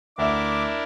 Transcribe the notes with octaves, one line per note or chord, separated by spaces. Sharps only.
D2 D4 E4 A#4 E5 D6